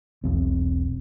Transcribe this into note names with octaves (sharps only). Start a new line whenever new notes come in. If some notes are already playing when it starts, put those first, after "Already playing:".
E1 B1 E2 C4